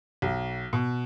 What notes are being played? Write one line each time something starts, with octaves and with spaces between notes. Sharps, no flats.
B1
B2